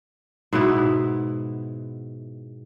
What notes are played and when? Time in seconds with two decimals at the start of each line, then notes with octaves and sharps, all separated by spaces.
0.53 G#2 B2 B3 E4